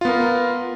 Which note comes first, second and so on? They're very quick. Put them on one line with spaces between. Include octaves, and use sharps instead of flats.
F4 B3 A#4